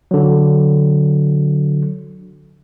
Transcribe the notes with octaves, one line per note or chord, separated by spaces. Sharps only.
D3 F#3